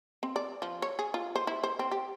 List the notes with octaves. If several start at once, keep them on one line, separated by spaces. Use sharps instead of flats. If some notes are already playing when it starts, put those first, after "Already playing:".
C4
D5
F3
C#5
G#4
F4
C5
E4
C5
C4
G4